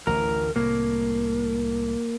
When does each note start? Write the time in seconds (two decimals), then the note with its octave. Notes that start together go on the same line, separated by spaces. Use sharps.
0.07 A1 D2 E3 A#4
0.56 C2 A2 A#3